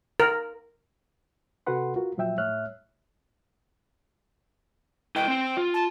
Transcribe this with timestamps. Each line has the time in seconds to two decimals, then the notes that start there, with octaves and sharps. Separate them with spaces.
0.20 A#4
1.66 C3 F#4 A4 B4 F#5 C6
1.96 F4 F#4 A#4
2.18 A#2 F3 F#3 E5 G5 E6
2.38 A2 C#5 E5 F6 F#6
5.16 E4 B4 D#5 G5
5.28 C4 C5
5.57 F4
5.74 A5